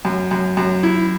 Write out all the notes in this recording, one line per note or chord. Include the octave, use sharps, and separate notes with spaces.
F#2
F#2
F#2
E4